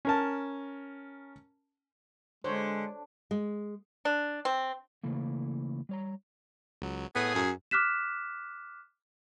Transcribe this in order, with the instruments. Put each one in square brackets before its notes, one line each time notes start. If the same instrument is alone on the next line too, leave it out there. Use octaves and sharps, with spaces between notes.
[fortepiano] C#4 A#4 A5
[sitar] D3 [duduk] G#3 [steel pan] C5 C#5
[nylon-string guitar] G#3
[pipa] D4
C4
[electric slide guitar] C#3 E3 A3 A#3
G3 C#5 A#5
[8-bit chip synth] C#2 F#3
[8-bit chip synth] A2 A3 D#6 [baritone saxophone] B3 [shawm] G#4
[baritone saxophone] F#2
[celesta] D6 F6 F#6 B6 E7